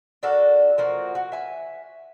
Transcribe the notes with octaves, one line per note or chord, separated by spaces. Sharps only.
D4 F#4 A4 A#4
F3 A#3 F#4
F#4
E5 G#5